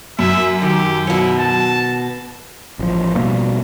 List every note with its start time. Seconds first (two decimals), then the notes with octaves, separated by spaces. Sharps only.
0.19 F#2 E5
0.62 D#3 G4
1.07 B2 E4 C#5
1.39 A5
2.79 A1 F3
3.15 B2 G3 A#3